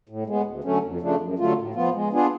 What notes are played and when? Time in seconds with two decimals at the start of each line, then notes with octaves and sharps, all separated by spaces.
0.09 A2
0.27 G#3 B3
0.46 D2
0.64 D3 F#3 A3 C#4
0.83 F2
1.01 C#3 F3 A3 D4
1.20 F#2
1.38 D3 F#3 A3 F4
1.57 A2
1.75 F3 B3 F4
1.94 G#3
2.12 B3 D4 F4 G#4